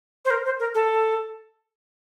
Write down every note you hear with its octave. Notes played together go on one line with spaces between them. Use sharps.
C5
A#4
C5
A#4
A4